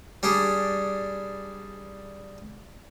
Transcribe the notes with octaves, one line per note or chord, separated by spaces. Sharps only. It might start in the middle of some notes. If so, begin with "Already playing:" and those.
G3 D4 G#4